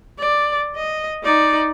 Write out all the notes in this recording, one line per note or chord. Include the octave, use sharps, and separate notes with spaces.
D5
D#5
D#4 D5